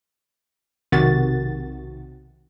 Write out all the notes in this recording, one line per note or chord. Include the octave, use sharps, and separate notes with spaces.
B1 C3 D#3 F#4 A6